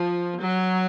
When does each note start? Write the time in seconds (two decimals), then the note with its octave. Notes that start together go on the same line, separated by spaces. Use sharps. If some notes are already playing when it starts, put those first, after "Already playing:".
Already playing: F3
0.41 F#3